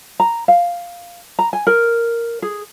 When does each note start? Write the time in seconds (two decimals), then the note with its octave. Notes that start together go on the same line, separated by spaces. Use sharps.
0.20 A#5
0.48 F5
1.39 A#5
1.53 G#5
1.67 A#4
2.42 G#4